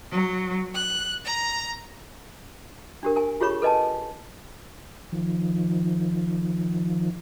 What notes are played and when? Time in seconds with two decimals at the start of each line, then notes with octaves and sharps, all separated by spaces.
0.11 F#3
0.75 F#6
1.24 A#5
3.03 D4 G4 A#4
3.16 A#4 G#5
3.41 F4 G4 G#4 C#5 B5 C#6
3.62 A4 B4 D#5 G#5 A5
5.12 D#3 F3